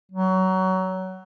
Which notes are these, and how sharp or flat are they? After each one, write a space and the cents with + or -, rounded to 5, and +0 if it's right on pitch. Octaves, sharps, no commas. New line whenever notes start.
F#3 +20